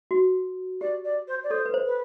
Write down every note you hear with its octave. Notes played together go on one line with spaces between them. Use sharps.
F#4
G4 D5
D5
C5
D5
A4 C5
B4
C5
B4